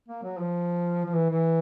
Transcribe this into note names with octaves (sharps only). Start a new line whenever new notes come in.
A#3
F#3
F3
F3
E3
E3